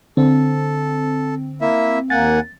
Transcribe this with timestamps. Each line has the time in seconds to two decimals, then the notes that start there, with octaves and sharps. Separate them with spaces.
0.17 D3 C4 A4
1.61 A#3 E4 E5
2.10 D#2 A#3 F#5 G#5 A6